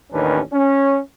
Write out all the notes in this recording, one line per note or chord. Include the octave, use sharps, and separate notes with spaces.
A1 D#2 D#3 C#4 D4 B4
C#4